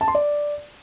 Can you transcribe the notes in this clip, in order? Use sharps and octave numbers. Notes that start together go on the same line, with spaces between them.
A5
C6
D5